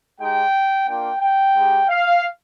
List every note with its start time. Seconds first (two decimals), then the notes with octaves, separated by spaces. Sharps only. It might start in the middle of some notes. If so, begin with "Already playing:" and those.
0.19 G#3 D#4 G4 G5
0.87 A#3 D4 F4 G5
1.21 G5
1.55 G#3 D#4 G4
1.89 F5